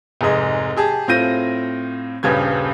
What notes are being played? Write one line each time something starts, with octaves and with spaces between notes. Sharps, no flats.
F1 G#2 G#4 D#5
G4 G#4 A5
A2 C4 F4 G6 A#6 D#7
D#1 G2 C#3 G4 B4 G#6